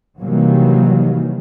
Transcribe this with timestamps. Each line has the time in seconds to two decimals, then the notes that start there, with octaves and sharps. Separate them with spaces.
0.21 C3 D#3 E3 F#3 G3 A#3